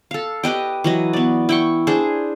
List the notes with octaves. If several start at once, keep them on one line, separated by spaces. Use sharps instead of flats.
A4 F5
G4 B4 D#5 G5
E3 F#3 D#5
B3 D5
E4 G5 C#6
D4 G#4 C5